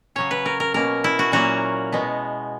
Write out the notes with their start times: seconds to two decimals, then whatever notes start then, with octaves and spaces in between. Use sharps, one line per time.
0.16 C#3 F#3 C#4 C#5
0.31 B4
0.46 A#4
0.60 A#4
0.74 B2 A#3 C#4 A#4
1.04 E4
1.19 F#4
1.32 A#2 F#3 A#3 C#4 F#4
1.92 B2 G#3 B3